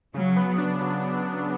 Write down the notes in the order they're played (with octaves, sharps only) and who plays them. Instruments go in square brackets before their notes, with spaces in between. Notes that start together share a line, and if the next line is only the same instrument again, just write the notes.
[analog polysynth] C#3 [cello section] F#3
[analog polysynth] B3
D4
F#3